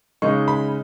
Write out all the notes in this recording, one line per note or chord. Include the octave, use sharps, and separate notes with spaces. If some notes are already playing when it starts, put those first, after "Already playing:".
C#3 G#3 D#4 C#6
B5